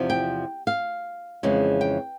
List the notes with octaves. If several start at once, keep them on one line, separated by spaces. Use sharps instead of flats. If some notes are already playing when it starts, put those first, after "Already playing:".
Already playing: E2 C3 F3
G5
F5
F2 C#3 E3 G#3
G5